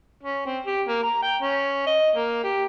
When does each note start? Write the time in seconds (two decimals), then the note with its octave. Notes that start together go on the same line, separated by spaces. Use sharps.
0.23 C#4
0.46 C4
0.66 G4
0.88 A#3
1.03 A#5
1.23 G5
1.42 C#4
1.87 D#5
2.15 A#3
2.44 G4